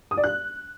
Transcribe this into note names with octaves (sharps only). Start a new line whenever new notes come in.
D#6
D5
F#6